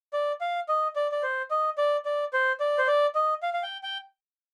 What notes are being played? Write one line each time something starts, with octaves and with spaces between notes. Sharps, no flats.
D5
F5
D#5
D5
D5
C5
D#5
D5
D5
C5
D5
C5
D5
D#5
F5
F5
G5
G5